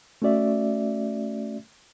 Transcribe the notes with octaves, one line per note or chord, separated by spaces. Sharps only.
A3 C#4 F#4 D5 E5